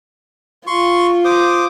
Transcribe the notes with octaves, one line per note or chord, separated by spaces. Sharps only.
F4 C6 C#6
C5 D6 D#6